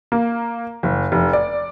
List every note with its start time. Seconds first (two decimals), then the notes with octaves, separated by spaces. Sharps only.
0.12 A#3
0.83 F#1
1.12 F1
1.33 D5